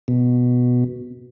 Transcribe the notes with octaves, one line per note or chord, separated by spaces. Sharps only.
B2